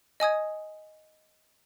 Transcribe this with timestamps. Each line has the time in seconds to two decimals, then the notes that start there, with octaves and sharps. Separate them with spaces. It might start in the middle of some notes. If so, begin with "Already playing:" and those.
0.20 D#5 G#5 D#6 G#6